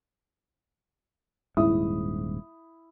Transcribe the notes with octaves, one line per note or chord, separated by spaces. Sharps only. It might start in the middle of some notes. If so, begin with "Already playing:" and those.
D#1 G#2 E4 D#6